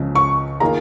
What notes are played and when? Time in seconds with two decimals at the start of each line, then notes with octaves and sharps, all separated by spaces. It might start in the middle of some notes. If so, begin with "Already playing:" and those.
Already playing: C#2 C#3 F3
0.15 C#6
0.60 D#3 A#3 F4 G#4 A#5